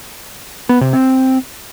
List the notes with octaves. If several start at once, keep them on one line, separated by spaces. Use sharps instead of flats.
B3
C3
C4